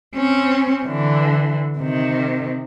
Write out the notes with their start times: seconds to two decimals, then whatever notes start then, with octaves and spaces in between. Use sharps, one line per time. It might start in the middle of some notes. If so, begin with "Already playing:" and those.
0.15 C4 C#4
0.84 D3 E3
1.78 C3 D#3